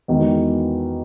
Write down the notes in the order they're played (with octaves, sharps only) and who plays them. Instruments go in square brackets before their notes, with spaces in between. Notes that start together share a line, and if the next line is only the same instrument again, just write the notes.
[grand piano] E2 D#3 G#3 D#4 F#4